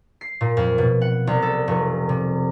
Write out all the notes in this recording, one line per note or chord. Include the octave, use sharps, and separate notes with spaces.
C7
A#2
F2
B2
F#5
C2
A4
F1
C3